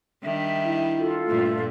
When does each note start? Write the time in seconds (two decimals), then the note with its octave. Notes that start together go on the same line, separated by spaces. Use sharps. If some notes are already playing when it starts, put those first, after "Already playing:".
0.24 D#3 G3 D4 E5
0.66 E4
0.97 F4 A4
1.28 G2 A#2 A3